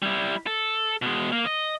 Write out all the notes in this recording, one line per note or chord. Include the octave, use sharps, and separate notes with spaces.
G3 E4
A4
B2 G#3
A#3
D#5